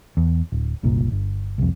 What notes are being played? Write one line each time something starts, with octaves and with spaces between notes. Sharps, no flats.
E2
D1
F#1 C2 A#2
G1
C2 F2